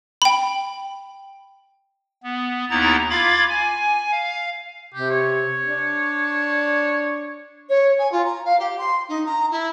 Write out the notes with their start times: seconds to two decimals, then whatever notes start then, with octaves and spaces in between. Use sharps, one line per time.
0.22 G5 B5
2.23 B3
2.70 D#2 B3 D#4 E4 A#5 A6
3.10 F4 F5 B5 D6 G#6 A6
3.49 G#5
4.11 F5
4.94 C3 G4
5.10 C#5
5.64 D4
7.69 C#5
7.98 G#5
8.11 F4
8.24 A#5
8.44 F5
8.59 G4
8.78 C6
9.08 D#4
9.25 A#5
9.50 E4